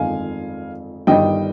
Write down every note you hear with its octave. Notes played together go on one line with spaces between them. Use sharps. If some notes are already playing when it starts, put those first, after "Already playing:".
Already playing: G1 F2 D#3 G#3 F5 G#5
G1 G2 D#3 G3 D#5 G5